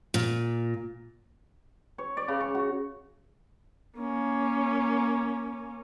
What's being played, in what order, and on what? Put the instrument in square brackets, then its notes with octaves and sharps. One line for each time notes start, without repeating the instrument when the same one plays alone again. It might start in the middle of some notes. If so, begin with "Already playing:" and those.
[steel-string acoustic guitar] A#2
[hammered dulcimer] C#5
D5
C#3
C#6
F#4
[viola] A#3 C#4